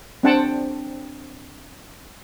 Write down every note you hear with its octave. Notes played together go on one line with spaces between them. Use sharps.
C4 D4 C5 F#5 G5 A5